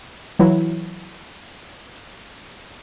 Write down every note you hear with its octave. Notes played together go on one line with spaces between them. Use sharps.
E3 F#3 E4